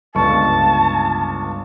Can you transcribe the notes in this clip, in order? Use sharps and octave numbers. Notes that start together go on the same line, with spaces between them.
G1 C#2 A5 C#6